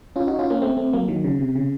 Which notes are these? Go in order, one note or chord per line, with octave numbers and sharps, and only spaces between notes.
C#4 F4
D#4 F#4
C#4 F4
A#3 C#4
A3 C4
A3 C4
F#3 A#3
D#3 F#3
C#3
C3
C#3